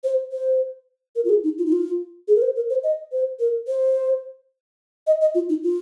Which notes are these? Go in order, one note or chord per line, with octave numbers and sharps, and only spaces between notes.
C5
C5
A#4
F4
G#4
D#4
F4
D#4
F4
G#4
A#4
C5
A#4
C5
D#5
C5
A#4
C5
D#5
D#5
F4
D#4
F4